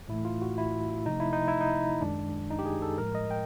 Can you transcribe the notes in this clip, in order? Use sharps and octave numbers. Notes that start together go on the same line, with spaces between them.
A2 E3 A3 E4
F4
F#4
E4
C3 F3 A3 D#4
E4
D#4
E4
D#4
F#2 D#3 G#3 D4
D#4
G4
G#4
A4
A2 F3 G#3 A#4
D#5
G5